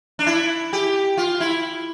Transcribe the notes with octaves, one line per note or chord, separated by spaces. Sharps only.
D4
E4
G4
F4
E4